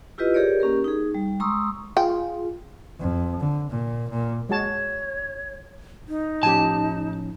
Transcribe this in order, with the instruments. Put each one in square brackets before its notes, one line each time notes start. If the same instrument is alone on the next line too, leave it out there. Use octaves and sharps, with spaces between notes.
[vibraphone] E4 F4 G4 B4 D#5
G4 G#4 A#4 C#5 D5
A#3 C#4 G4 A#4
D#4 G#4
G3
G#3 A#5 C6 C#6 D#6 E6
[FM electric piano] F4 G#4 [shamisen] G5
[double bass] F2
D3
A#2
A#2
[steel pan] G#3 F#4 A5 [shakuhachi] C#5
[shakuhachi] D#4
[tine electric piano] A2 F3 C#4 [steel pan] G4 G#5 [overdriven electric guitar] A5